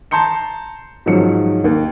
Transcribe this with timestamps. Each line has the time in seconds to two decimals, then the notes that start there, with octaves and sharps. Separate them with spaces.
0.11 A5 A#5 C6 G6 C#7
1.06 G#2 D#3 F3 F#3 C#4 C#7
1.64 D#2